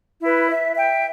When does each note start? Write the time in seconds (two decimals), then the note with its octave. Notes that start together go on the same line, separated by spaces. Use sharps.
0.21 E4 B4
0.49 E5
0.76 E5 G5